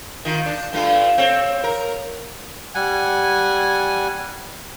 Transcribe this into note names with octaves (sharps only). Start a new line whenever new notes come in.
D#3 F4
D4
G2 A3 F4
C4 C#5
A#4
G3 F#5 G#5